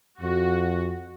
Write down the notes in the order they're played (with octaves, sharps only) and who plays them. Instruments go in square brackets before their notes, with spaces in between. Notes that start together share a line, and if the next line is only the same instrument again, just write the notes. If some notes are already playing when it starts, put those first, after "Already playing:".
[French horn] F2 [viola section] F#4